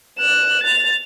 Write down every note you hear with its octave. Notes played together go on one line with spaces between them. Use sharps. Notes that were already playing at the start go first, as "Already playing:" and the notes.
F#6 E7
A6 F7